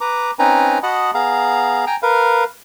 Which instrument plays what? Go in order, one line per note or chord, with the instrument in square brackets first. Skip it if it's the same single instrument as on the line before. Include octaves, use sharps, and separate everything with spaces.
[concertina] B4 A#5 D6
C4 C#4 D#4 B4 G#5 A#5
F#4 D#5 F#5 A5 B5 D#6
B3 G#4 F5 A#5
G5 G#5 A#5
A#4 B4 F5